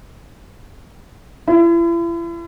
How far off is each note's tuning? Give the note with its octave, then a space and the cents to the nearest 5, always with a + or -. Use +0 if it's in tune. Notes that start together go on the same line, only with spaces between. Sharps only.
E4 +40